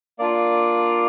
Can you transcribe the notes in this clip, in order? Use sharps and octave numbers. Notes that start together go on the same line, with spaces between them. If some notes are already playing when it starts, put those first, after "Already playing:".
A#3 D4 F4 D5